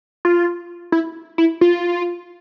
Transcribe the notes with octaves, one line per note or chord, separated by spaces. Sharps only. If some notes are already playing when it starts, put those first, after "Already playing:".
F4
E4
E4
F4